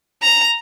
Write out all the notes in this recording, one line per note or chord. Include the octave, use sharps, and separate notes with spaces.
A#5